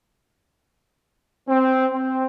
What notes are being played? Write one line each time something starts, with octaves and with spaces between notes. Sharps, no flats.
C4
C4